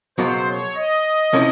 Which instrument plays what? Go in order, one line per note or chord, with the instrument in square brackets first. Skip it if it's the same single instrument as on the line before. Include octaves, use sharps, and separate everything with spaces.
[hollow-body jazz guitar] C#2 B2 F#3 A#3 [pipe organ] C5
[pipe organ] C#5
D#5
[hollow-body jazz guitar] C3 F3 A#3 C#4 E4